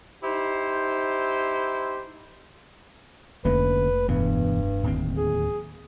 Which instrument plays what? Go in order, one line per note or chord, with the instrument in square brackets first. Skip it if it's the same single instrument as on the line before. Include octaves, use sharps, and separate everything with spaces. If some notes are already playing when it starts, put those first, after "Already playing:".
[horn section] D#4 E4 G4 C5
[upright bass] F1 A3 [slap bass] D3 A#3 C#4 [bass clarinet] B4
[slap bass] E1 E3 B3 [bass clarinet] G2
[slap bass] D1 D#2 C4
[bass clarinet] G#4